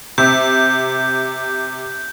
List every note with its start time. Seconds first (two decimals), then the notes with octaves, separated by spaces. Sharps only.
0.18 C3 G6